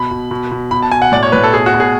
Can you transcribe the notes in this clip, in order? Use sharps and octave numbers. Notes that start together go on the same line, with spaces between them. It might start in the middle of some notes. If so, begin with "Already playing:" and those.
Already playing: B2 B5
B2
B2
B2
B2 B5
A5
B2 G#5
F#5
A2 D5
C#5
A2 B4
A4
B2 G#4
F#4
B2
G#4